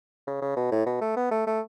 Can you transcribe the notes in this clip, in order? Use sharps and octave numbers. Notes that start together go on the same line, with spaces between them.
C#3
C#3
B2
A2
B2
A3
B3
A3
A3